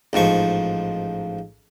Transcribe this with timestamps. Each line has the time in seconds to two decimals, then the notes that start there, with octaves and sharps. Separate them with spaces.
0.13 A1 G#2 F3 C#6